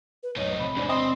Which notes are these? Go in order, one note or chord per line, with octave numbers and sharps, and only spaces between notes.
B4
B1 F#2 A2 D#4 C#5
E1 F2 C3 B5
D#2 G#2 D4
C4 D#5 C6